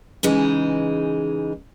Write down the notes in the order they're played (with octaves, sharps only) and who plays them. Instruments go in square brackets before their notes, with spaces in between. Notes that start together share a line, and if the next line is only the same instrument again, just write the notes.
[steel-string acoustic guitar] C#3 E3 G#3 D#4